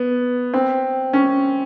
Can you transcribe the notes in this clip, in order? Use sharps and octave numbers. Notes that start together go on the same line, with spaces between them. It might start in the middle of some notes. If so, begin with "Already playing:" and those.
Already playing: B3
C4
C#4